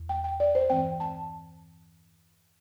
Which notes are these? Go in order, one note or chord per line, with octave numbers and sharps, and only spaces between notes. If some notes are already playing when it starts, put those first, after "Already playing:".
Already playing: E2
G5
G5
D5
C5
G2 E3 C4 G5
A5